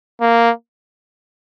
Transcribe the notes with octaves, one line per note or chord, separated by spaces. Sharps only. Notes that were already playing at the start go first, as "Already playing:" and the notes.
A#3